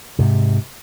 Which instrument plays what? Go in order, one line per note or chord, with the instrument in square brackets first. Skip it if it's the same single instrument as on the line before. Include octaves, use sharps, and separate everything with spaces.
[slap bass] G#2 C3